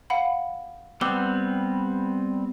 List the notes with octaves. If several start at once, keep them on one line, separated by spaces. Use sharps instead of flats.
F5 F#5 B5
G3 B3 C4 D6 E6 G7